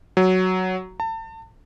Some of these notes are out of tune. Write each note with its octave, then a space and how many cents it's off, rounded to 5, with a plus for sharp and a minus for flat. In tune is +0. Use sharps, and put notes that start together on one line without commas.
F#3 +5
A5 +35